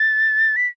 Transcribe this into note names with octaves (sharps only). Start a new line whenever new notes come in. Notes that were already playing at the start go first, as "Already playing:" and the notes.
Already playing: A6
B6